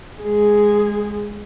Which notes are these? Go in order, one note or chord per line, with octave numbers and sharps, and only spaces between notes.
G#3 G#4